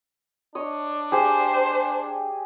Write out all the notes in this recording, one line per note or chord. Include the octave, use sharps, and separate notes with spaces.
D4 C#5 D#5
G4 G#4 C5